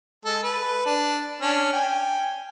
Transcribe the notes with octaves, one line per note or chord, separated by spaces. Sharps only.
G#3 A4
B4
D4
C#4 D4
G5 G#5